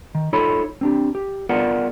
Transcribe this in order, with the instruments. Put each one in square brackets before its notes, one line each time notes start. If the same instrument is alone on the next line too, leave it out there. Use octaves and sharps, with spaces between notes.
[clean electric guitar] D#3
D#4 F4 A4 C#5 B5
C4 D4 G4
G4
B3 F4 G#4 A#4 D5 F#5